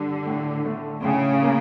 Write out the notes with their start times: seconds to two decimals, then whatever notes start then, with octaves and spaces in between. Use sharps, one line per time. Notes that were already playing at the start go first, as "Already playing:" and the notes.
Already playing: G2 D3 G3
0.26 A2
0.66 A3
1.04 A2 C#3
1.43 A#3